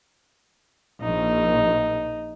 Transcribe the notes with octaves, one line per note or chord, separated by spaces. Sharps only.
A#1 D#4